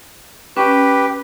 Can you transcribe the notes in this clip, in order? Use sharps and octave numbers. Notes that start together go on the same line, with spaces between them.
C#4 G4 B4